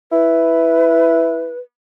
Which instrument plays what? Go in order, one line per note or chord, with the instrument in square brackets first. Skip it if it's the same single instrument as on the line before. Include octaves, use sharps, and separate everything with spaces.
[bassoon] E4 [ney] B4